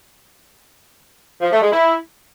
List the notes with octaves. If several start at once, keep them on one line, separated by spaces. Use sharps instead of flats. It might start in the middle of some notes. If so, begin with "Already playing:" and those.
F3
A3
G#3
E4